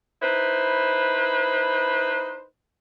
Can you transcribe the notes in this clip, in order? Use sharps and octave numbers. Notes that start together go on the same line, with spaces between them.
D#4 E4 B4 C5